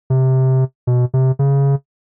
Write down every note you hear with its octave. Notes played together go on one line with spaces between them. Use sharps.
C3
B2
C3
C#3